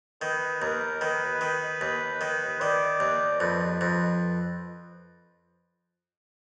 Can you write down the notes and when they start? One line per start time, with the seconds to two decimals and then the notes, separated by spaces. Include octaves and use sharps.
0.22 D#3 B4
0.62 D#2 A#4
1.01 D#3 B4
1.41 D#3
1.81 D#2
2.21 D#3
2.61 D#3 D5
3.00 D#2
3.40 F2 B4
3.81 F2